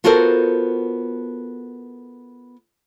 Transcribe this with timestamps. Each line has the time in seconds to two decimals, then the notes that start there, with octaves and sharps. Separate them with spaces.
0.04 B3 F4 F#4 A4 A#4 C5